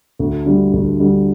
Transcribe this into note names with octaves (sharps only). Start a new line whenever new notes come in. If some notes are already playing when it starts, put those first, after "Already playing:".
D2
D3 G3
D2
D3 G3